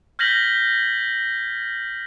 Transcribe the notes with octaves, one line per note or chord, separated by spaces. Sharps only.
F6 G6 G#6 A#6 B6 F#7